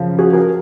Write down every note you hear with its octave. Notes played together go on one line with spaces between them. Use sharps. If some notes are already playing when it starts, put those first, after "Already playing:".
Already playing: F#2 C#3 F3
F#4 G#4
G#4 A#4